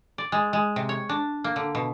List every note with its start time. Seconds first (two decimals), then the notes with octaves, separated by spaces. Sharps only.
0.18 D5
0.32 G#3
0.53 G#3
0.76 C3
0.89 C#5
1.09 D4
1.44 A#3
1.56 D3
1.75 B2